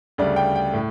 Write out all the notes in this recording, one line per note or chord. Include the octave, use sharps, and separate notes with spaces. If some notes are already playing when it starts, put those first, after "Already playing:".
D2 C#3 G3 D5
G5
G5
A2